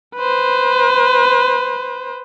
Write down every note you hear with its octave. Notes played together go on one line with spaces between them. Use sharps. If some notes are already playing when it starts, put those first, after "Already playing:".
B4 C5